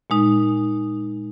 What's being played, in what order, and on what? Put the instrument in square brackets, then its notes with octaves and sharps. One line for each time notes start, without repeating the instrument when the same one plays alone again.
[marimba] A#2 G#3 D#4